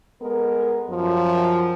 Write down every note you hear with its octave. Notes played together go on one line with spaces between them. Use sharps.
G#3 B3 A4 A#4
F#2 F3